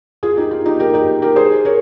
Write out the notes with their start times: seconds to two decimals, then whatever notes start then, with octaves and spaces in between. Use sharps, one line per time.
0.23 F4 G#4
0.37 D#4 G4
0.51 F4
0.66 D#4 G4
0.79 G4 A#4
0.94 D#4 G4
1.22 G4 A#4
1.36 G#4 C5
1.65 A#4 C#5